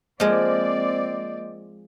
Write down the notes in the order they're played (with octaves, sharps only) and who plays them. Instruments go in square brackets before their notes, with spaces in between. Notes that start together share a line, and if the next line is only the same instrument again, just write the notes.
[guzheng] F3 G#3 [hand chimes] A#3 D#5 G6 [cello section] C4 D5